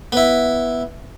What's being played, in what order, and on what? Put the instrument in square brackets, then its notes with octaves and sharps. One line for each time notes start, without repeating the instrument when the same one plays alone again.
[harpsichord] B3 E4